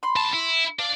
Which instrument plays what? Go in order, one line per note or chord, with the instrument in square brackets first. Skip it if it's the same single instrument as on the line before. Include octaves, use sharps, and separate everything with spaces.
[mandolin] B5 C6
[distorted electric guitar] D#2 A5
E4
[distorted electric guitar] D4 [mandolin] F5